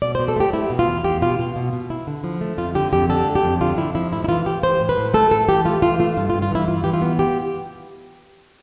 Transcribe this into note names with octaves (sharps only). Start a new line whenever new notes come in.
B2 D5
C5
B2
A4
A3 G4
A3 E4
B2
F4
E2
E2 G4
B2 F4
B2
B2
B2
E4
D3
F3
A3
F2 F4
D3 G4
F2 G4
D3 A4
A3
G4
F2
D3 F4
F2 E4
F3 E4
A2 E4
E4
E3 F4
E3 G4
E3 C5
A2
B4
A2
A3 A4
A2 A4
E3 G4
A3 F4
E3 F4
A3 F4
G2 F4
F4
G2
F4
E3 E4
G2 F4
E3 G4
F4
B3
G4